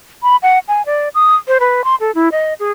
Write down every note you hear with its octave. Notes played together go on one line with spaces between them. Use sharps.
B5
F#5
G#5
D5
D#6
C5
B4
C6
A4
E4
D#5
G#4